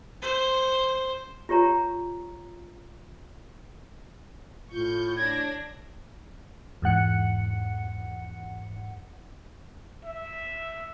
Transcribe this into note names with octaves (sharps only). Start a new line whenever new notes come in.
C5
F4 G4 C#5 A#5
A2 F4 C#6 G6
D4 C#5 G#6 A#6
E2 G#2 F#5 C#7
E5